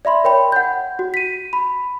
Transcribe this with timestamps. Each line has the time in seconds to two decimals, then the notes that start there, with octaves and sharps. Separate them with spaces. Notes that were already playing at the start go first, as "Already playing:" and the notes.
0.05 D5 E5 B5 C6
0.24 A#4 C#5 G5 B5
0.52 F#5 G6
0.99 F#4
1.14 B6 D#7
1.53 B5